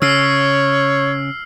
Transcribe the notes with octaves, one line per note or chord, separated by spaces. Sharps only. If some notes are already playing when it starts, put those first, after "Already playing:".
C#3 C#5 E6 F6 C7